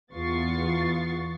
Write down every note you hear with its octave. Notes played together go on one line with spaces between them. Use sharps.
E2 B3 F4 C#6 A6 C7